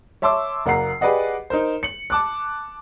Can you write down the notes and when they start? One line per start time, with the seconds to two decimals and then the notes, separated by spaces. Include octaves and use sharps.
0.22 C#5 E5 A5 C6 D6 E6
0.66 F#1 A#3 F#5 A#5 C7
1.01 G4 G#4 B4 D5 D#5 F#5
1.50 D#4 A#4 C5
1.83 C#7 F#7
2.10 A5 D6 F#6